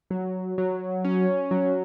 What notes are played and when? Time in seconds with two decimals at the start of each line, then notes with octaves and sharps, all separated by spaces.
0.10 F#3
0.58 F#3
1.04 C#4
1.51 F#3